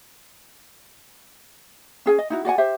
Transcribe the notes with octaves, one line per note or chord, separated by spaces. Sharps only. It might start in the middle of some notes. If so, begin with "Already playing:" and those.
C#4 G#4 G#5
D#5
D#4 E4 F#4
F#4 D5 F#5 G#5
G4 C5 E5